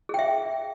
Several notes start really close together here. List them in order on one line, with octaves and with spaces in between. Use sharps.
G#4 G5 E5